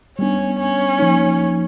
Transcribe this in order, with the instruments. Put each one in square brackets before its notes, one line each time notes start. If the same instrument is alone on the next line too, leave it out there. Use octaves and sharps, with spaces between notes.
[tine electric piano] G3 B3 D4 [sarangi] C#4
[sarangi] C#4
[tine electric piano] F3 A#3 D#4